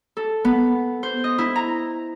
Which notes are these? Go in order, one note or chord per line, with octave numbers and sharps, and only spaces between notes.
A4
B3
C5
D#5
E4
A#5